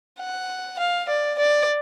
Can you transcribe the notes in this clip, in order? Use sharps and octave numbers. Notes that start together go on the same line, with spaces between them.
F#5
F5
D5
D5